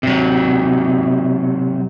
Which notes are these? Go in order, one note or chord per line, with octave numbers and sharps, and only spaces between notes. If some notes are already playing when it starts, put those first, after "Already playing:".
C3 F#3